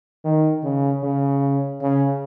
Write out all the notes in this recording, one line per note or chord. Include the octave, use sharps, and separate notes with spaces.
D#3
C#3
C#3
C#3